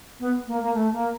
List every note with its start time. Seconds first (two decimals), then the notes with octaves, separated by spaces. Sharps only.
0.20 B3
0.47 A#3
0.61 A#3
0.74 A3
0.93 A#3